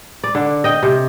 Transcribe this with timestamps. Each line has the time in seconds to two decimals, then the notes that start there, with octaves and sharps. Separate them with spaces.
0.24 D5
0.35 D3
0.64 D#5 G5
0.83 C3